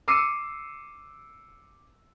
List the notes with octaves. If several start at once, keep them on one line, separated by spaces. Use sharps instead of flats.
D6 E6 C7 C#7 D#7